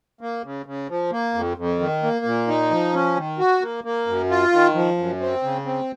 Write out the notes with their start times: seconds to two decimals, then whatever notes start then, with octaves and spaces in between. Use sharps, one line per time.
0.21 A#3
0.44 C#3
0.66 C#3
0.89 F3
1.12 A#3
1.34 F2
1.57 F2
1.79 D#3
2.03 A#3
2.25 A#2
2.47 D#4
2.71 F3
2.93 C#4
3.16 D#3
3.39 F#4
3.61 A#3
3.84 A#3
4.07 F#2
4.30 F4
4.52 D#3
4.75 F3
4.98 F#2
5.20 C4
5.43 C#3
5.66 C4